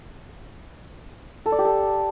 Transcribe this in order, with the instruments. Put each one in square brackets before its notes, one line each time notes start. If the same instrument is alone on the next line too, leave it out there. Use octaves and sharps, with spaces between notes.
[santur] A4
D5
G4
A4